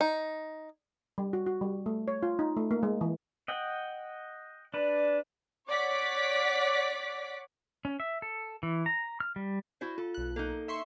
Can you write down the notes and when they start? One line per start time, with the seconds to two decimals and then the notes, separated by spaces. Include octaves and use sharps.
0.01 D#4
1.18 G3
1.33 F#4
1.46 F#4
1.61 G3
1.86 A3
2.08 C#5
2.23 F4
2.39 D#4
2.57 A3
2.71 A#3
2.83 G#3
3.01 E3
3.48 D#5 F#5 G5
4.74 D4 B4 D5
5.68 C#5 D5 F#5 D6 B6
7.85 C#4
8.00 E5
8.22 A4
8.63 E3
8.86 A#5
9.20 F6
9.36 G3
9.81 E4 F#4 C5
9.98 F4 A4
10.14 B1 F#6
10.36 A#3 D#4 A4
10.68 E5 C6 C#6